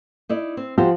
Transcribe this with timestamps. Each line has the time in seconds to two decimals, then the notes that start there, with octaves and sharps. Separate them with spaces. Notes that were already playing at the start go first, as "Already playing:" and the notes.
0.29 D#4 E4 D5
0.57 C4
0.78 F3 F#4 G4 C5